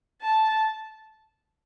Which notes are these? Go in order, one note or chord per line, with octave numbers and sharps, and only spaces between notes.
A5